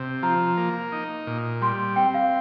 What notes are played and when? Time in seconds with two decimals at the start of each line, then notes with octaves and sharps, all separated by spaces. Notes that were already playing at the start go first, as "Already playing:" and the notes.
Already playing: C3
0.23 F3 A#5
0.57 A#3
0.92 D#4
1.27 A#2
1.61 G3 C6
1.96 C4 G5
2.14 F5